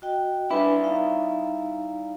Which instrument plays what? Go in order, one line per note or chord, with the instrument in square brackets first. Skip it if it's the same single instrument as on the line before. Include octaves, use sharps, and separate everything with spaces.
[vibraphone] F#4 D#5 G5
[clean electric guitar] G3 E4 [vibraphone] D4 B4 G#5
[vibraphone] D#4 F5 A#5